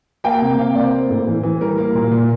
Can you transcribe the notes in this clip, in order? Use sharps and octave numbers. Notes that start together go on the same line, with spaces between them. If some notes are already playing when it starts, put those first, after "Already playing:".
A#3 G5
C3
C3 F5
A#3 D5
C5
A#3
A2
E3
E3
G3 A#4
A#3
A#2
A#2